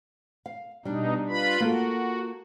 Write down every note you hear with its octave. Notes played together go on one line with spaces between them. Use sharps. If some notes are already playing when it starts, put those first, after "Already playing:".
F5
B2 G3 D4 D#4
F4 B4 B5
A#3 F4 F#4 A4